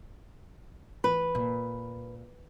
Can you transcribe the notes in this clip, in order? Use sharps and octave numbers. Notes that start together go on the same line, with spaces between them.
E3 B4
A#2